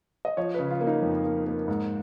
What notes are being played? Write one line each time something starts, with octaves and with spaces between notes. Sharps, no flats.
D#5
F3 C#5
C#3 B4
F4
A#3
D#4
F2
A#3
A#3
G#2